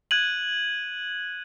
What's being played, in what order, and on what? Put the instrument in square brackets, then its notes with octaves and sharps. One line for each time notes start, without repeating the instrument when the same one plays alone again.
[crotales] F#6 G#6 D#7 F#7